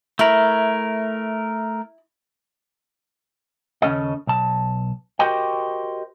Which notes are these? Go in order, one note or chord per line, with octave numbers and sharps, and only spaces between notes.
A3 E4 A#4
D#2 C#3 G#3 C#4 A4 D#5
B1 A5
F#4 G4 A#4 C5 D#5 G5